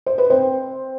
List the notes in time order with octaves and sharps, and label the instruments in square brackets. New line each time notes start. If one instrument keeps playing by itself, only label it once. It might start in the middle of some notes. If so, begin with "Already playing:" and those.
[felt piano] C5
B4
C4 C5